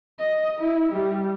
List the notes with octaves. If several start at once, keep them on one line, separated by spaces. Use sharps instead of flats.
D#5
E4
G3